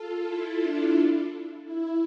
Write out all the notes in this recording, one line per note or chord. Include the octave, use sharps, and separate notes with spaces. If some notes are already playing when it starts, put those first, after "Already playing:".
Already playing: F4 A4
E4
D4
E4